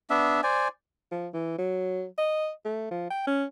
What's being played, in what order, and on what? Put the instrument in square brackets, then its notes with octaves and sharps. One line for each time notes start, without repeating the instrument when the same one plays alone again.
[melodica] B3 D4 E5
C5 D5 G#5
[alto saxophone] F3
E3
F#3
D#5
A3
F3
G5
C#4